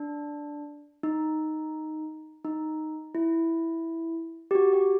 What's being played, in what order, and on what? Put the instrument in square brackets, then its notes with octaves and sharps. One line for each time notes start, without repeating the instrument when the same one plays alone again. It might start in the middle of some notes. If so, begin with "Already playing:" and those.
Already playing: [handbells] D4
D#4
D#4
E4
G4
F#4
G4